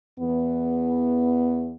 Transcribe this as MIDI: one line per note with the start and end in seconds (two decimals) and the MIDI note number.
0.19 1.76 40
0.19 1.76 59